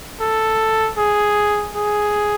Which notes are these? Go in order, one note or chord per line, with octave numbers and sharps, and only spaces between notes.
A4
G#4
G#4